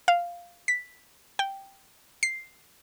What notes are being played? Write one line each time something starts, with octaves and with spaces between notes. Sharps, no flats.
F5
B6
G5
C7